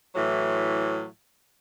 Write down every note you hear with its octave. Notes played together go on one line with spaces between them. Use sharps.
A2 E3 F#3